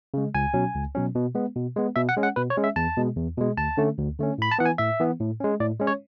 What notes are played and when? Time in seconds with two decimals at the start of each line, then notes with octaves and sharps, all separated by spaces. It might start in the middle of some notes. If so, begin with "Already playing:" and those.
0.14 C#3 G#3
0.35 C#2 G#5
0.54 B2 F#3 C#4
0.74 C#2
0.95 B2 F#3 C#4
1.15 B2
1.35 G#3 B3
1.56 B2
1.76 G#3 B3
1.96 B2 E5
2.09 F#5
2.17 G#3 C#4
2.23 F#5
2.36 B2 B4
2.50 C#5
2.57 G#3 C#4
2.64 E5
2.76 E2 A5
2.97 B2 G#3
3.17 E2
3.37 B2 G#3
3.57 D2 A5
3.77 D3 A3 C#4
3.98 D2
4.19 D3 A3 C#4
4.38 A2 B5
4.51 A5
4.59 E3 B3 F#5
4.66 G#5
4.78 A2 E5
5.00 E3 B3
5.20 A2
5.40 G#3 C#4
5.60 A2 D5
5.80 G#3 C#4
5.87 C#5